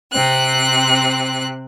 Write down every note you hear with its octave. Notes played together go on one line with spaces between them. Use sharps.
C3 C4 F#6